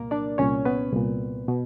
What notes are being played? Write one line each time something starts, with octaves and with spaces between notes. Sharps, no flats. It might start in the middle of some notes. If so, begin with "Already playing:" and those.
Already playing: C2 A#2 A#3 A#4
D4 D5
C2 A#2 C#4 C#5
B3 B4
C2 A#2
B2